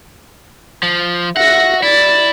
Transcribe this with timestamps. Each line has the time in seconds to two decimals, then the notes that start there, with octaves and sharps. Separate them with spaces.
0.83 F3
1.37 F#4 E5 F#5 A#6
1.83 E4 D5 A6